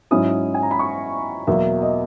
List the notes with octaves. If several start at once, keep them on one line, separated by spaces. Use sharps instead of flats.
G#2 F#3 C#4 E4 D#6
G#5
A#5
B5
C#6
E2 B2 F#3 A#3 E5
D#5